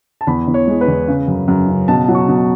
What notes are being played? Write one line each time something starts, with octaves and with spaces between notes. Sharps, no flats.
A5
E2 B5
E2
C#5
G#3
B4
E2
C#3
F#2
F#2
C#3
B2 A5
F#3
C#6
B2